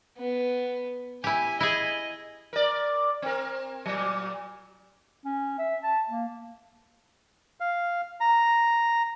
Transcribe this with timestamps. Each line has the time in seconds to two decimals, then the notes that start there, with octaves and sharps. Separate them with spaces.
0.18 B3
1.24 E4 G4 G#5
1.60 E4 G#4 D#5
2.53 A#4 D5
3.22 C4 A#4
3.86 A#2 F#3
5.25 C#4
5.58 E5
5.83 A5
6.09 A#3
7.60 F5
8.20 A#5